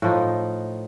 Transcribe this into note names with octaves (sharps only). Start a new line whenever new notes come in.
A2 F3 D#4